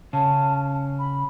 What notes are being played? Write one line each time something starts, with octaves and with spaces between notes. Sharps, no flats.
C#3 C#4 A5
B5